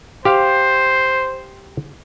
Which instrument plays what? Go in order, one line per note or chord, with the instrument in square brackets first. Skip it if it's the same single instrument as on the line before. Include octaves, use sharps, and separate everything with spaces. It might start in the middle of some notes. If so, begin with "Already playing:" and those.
[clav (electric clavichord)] G4 F5 [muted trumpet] C5